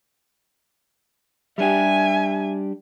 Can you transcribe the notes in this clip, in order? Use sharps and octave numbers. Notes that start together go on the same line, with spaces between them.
G3 D4 G4 E5 G#5